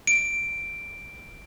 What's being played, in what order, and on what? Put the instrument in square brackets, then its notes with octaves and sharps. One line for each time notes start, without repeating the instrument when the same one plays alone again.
[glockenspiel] D7